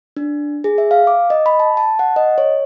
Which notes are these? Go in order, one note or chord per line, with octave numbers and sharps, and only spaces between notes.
D4
G#4
E5
F5
D6
D#5
B5
A5
A5
F#5
D#5
C#5